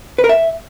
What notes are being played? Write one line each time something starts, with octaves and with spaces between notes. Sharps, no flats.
B4
A#4
E5